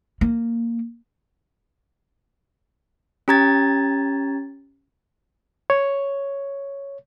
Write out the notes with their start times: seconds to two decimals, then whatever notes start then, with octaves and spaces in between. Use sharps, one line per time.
0.21 A#3
3.28 C#4 G4 A#5 G#6 A6
5.70 C#5